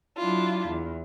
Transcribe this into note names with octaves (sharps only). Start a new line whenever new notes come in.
F#3 D4 E4 F4
E2